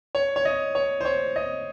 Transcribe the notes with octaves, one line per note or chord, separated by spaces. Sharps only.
C#5
C#5
D#5
C#5
C5
C#5
D#5